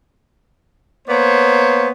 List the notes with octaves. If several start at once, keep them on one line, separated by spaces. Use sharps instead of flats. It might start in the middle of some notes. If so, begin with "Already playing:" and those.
A#3 B3 C5 C#5